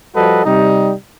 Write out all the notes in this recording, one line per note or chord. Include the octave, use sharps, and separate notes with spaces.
F3 G3 F#4 A4 B4 D#5
C3 G3 D#4